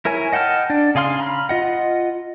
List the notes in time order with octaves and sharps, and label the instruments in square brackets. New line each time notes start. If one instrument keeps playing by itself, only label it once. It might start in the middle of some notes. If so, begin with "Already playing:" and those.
[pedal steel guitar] E4 A#4 C#5 G#5
D#5 F#5 G5 A5 F6
D4 D5
C#3 G#4 F5 C6 F6
A#5 B5 F6
F4 D#5 F#5